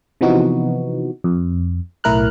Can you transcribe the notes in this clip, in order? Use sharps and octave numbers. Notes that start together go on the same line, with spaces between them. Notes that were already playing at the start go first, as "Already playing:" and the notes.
C3 E3 F3 B3 D#4 F#4
F2
B1 A2 E4 A#4 F6 F#6